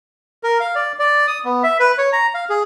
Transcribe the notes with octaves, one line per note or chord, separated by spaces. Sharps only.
A#4
F5
D5
D5
D#6
B3
E5
B4
C#5
A#5
F5
G#4